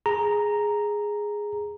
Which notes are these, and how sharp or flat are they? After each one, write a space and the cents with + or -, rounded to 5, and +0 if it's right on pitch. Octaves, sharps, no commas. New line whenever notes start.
G#4 +0 A#5 +0